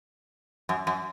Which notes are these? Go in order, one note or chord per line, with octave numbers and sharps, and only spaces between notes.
F#2
F#2